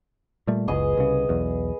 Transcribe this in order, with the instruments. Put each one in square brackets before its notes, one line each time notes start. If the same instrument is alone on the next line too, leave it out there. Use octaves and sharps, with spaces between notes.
[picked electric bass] A#2 G3 A3
[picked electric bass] F#1 C#2 [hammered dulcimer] B3 G#4 D#5
[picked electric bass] C2 C#3
B1 E2